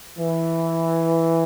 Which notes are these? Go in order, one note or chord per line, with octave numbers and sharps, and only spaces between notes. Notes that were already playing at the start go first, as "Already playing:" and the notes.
E3